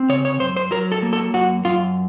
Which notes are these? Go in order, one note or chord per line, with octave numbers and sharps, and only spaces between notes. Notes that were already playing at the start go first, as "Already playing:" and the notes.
Already playing: C4
C#3 C#5
C#5
F#2 C5
C5
F#3 A#4
A4
A#3
A4
F#2 F#4
F#2 F4